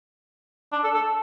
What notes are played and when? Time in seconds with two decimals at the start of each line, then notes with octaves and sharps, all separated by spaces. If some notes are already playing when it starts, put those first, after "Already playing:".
0.72 D4
0.84 A4
0.94 A4